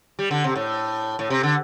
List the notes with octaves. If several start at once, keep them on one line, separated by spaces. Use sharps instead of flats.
G3
D3
C3
A2
A2
C3
D3